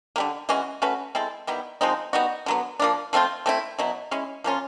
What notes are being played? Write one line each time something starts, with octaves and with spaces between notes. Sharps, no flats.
D3 G3 A#3
E3 G#3 C#4 F#4
A3 C#4 F#4 B4
G#3 C4 E4 A4
D#3 G3 B3 E4
F3 G#3 C4 D#4
G3 B3 D#4 F#4
D3 F#3 B3
F3 A#3 D4
F3 A3 C4 F4
A3 C4 E4
B2 F#3 B3 E4
G#3 C#4 E4
F3 A#3 C#4 F4